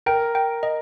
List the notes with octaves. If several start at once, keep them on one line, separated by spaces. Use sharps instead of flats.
A#4 G5
G5
D#5